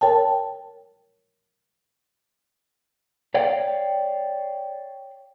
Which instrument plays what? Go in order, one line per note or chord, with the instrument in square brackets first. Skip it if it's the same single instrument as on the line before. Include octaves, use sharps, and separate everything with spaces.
[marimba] A#4 C#5 G5 A5
[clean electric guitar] C#5 D5 F5 G5